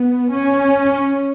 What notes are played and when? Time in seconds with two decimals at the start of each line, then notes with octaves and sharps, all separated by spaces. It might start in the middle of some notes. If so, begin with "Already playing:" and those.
Already playing: B3
0.32 C#4